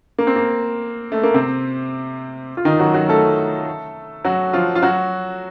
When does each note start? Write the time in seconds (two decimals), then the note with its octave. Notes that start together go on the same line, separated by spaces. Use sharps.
0.18 A#3
0.27 C4
0.36 A#3
1.12 A3
1.23 A#3
1.34 C3 C4
2.57 F4
2.65 D#3 D#4
2.79 F#3 F#4
2.94 F#3 F#4
3.09 A3 A4
4.25 F#3 F#4
4.53 F3 F4
4.75 F4
4.82 F#3 F#4